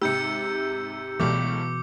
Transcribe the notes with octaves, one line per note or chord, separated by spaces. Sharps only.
G#2 C3 G4 E6 G6 C#7
C#2 B2 E3 G3 A3 D6